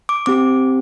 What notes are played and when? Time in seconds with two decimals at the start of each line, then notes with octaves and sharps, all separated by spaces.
0.09 D6
0.26 C4 G4 D6